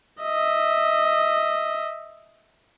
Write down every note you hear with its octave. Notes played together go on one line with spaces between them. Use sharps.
D#5 E5